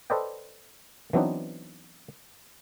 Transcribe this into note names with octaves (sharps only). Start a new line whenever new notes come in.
A4 B4 C5 D5 D#5 G5
E3 F#3 B3 C4 D4 D#4